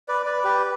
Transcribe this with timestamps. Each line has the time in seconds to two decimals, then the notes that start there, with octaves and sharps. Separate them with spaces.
0.08 B4 D5
0.25 B4 D5
0.44 G4 B4